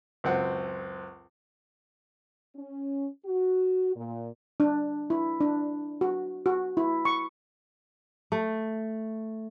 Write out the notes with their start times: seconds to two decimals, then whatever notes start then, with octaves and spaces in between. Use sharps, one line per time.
0.24 C#2 F#2 C4 F#5
2.56 C#4
3.26 F#4
3.95 A#2
4.60 D4
5.10 E4
5.41 D4
6.01 F#4
6.46 F#4
6.77 E4
7.05 C#6
8.32 A3